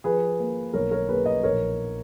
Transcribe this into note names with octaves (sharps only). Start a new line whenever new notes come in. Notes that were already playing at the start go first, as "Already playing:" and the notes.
F3 G#4 B4
A#3
B1 A#4 C#5
A#4 C#5
A#3 G#4 B4
B4 D#5
A#1 A#4 C#5